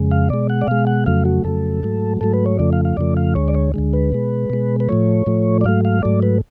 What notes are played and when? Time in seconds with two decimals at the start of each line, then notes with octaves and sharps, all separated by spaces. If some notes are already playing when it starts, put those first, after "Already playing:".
Already playing: F2 C#3 G#3
0.11 F5
0.29 B2 G#3 D5
0.50 F#5
0.61 D5
0.67 B2 G#3 F5
0.87 F#5
1.06 F2 C#3 F#3 A3 F5
1.25 F#4
1.44 F2 C#3 F#3 A3 A4
1.83 G#2 F#3 A3
2.21 G#2 F#3 A3 A4
2.33 B4
2.46 C#5
2.59 F2 C#3 F3 A3 D5
2.73 F5
2.85 F5
2.97 F2 C#3 F3 A3 D5
3.17 F5
3.35 D2 D3 G#3 C#5
3.48 D5
3.54 C#5
3.74 D2 D3 G#3
3.93 B4
4.12 B2 G#3
4.50 B2 G#3
4.80 B4
4.89 A2 F3 A3 C#5
5.26 A2 F3 A3
5.61 D5
5.64 G#2 F#3 A3 F5
5.85 F5
6.03 G#2 F#3 A3 D5
6.23 B4